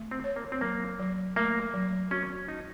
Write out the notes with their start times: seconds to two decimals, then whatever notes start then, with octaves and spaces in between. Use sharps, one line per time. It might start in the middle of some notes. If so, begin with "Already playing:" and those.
Already playing: A3
0.11 C4
0.24 C#5
0.36 A#3
0.52 C4
0.61 F#3 A#3
0.99 F#3
1.36 A3 A#3
1.74 F#3
2.11 C#4 F#4
2.48 C#4 D#4